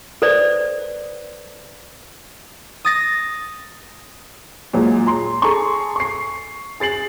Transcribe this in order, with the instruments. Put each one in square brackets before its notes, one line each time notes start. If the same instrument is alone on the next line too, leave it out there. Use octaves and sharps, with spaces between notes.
[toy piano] A4 B4 C5 D5
[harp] D#6 A6 A#6
[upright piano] A#2 F#3 G#3
A#5 C6
G#4 A4 G#5 A#5 C6 C#6
C#6 C7
G#4 A6 C7 F#7